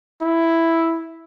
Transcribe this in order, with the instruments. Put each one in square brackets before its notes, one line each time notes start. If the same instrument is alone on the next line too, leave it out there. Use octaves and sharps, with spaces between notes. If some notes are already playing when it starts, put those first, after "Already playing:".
[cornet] E4